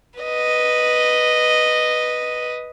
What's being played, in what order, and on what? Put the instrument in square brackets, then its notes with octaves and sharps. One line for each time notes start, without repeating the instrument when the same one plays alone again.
[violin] B4 D#5